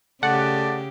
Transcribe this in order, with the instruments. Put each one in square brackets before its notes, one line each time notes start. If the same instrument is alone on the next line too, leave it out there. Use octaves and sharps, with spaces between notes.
[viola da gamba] C#3 G4 [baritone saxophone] A3 [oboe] D5 [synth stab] F#5